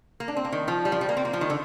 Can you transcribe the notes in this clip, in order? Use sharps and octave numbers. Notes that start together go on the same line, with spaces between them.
A#3
D4
C4
A#3
D#3
F3
G3
F3
G3
A#3
C4
A#3
F3
D#3
D3